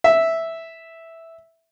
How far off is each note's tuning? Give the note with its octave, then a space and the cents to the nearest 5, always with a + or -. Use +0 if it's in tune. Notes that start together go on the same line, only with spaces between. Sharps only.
E5 -5